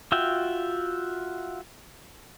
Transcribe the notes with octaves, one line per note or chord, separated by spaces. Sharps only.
F4 F#4 E5 G5